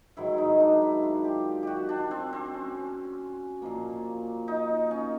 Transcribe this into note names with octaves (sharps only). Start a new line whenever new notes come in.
G#2 D#3 F#3 E4
D#4
D4
E4
F4
G4
F#4 G4
D4
C4
C4
C#4
A#2 F3 A#3
D#4
C#4